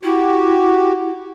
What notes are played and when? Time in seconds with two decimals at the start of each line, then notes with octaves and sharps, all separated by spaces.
0.03 E4 F#4 G4